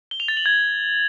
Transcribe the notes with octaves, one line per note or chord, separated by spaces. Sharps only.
G7
F7
A6
F#7
G#6